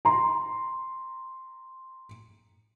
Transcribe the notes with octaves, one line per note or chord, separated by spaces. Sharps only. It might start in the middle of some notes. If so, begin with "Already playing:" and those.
A#5 C6